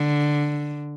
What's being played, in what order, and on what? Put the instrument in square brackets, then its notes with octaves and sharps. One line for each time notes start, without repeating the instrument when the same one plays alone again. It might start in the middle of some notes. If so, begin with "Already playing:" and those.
Already playing: [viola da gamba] D3